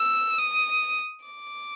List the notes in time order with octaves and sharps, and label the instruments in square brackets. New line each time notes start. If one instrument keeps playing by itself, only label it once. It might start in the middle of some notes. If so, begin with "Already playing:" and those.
Already playing: [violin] E6
D#6
D6